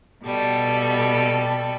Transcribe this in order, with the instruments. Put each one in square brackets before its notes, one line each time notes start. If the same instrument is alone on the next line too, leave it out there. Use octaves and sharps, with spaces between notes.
[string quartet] B2 G3 A4